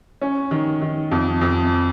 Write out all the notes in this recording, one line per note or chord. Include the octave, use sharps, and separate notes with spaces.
C#4
D#3
D#3
F2
F2